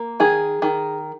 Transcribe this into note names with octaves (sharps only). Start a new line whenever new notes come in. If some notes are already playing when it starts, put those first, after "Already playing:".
Already playing: A#3
D#3 G#4
D#3